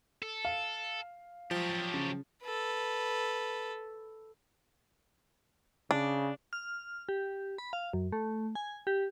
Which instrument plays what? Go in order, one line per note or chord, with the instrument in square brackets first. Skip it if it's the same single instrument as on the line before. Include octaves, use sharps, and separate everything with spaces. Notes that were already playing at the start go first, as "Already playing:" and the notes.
[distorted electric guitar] A4
[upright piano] F5
[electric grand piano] F3 [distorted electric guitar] F#3 G4
[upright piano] C#3
[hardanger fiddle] A4 B4
[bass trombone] C#3 [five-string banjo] D4
[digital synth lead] F6
G4
B5
F5
F#2
A3
G#5
G4